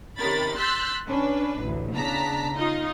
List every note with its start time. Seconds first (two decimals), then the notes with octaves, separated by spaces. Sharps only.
0.18 C3 D#3 C#4 A#4 B5 A6
0.58 C6 E6 F#6 G6 A6 B6
1.08 C#4 D4 B4
1.61 A1 D2
1.95 C#3 B3 D4 A5 A#5 B6
2.55 D#4 F4 D#5